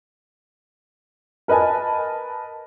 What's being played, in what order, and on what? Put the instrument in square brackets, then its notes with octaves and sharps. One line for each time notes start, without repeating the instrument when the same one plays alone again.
[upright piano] A#4 B4 D#5 G#5 A5